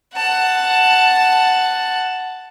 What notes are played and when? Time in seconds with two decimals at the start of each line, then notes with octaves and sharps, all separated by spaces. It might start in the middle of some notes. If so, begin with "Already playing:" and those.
0.14 F#5 A5